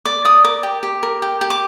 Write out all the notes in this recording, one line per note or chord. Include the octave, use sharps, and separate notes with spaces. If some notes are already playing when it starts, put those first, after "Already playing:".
D5 D6
D5 D#6
A#4 D6
G4
G4
A#4
G4
G4
D6